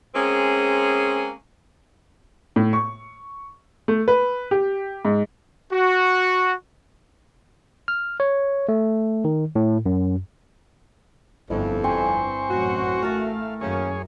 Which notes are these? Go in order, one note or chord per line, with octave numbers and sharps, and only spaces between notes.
G#3 A#3 C4 C#4 G#4
A2
C#6
A3
B4
G4
G#2
F#4
F6
C#5
A3
D#3
A2
F#2
G1 F2 E4
G2 C4 C5 G5 G#5 B5 C#6
A1 F#2 F#4
A3 A#4 F5 A5
F#2 D#3 A#3 C#4 G#4 C#5